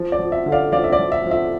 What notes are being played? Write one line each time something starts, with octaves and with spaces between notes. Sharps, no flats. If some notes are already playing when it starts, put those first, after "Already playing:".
Already playing: F3
D5
F3
E5
D3
D5 F5
F3 D5 F5
E5
D5
F3
E5
F3
E5